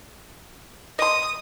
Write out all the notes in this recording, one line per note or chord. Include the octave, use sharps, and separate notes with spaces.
D#5 C6 D#6